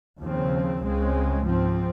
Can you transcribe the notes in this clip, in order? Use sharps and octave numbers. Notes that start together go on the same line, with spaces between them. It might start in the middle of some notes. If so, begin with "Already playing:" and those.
D#2 C#3 F3 C4
C#2 C#3 G#3 C4
G#2 F3 C4